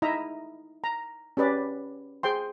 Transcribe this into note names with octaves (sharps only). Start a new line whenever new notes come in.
D#4 E4 D#5 E5 A#5
A#5
C#4 G4 B4 D5
G#4 C5 G5 C6